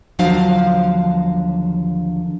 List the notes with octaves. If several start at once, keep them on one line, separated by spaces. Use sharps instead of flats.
D#2 D3 F3 F#3 D4 F5